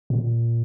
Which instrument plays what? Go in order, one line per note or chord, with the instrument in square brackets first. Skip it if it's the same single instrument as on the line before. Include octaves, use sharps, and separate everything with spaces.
[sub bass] A#2